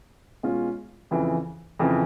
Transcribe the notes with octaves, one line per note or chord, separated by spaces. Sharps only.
B2 G#3 C#4 F4
F2 C#3 E3
F2 C#3 E3